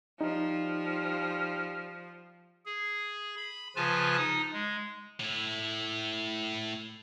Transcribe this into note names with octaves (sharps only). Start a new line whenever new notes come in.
F3 G3 D#4
G#4
B5
C#3 F3 F4 B4 G#5 A5
D#4 D#6
G#3
A2 E4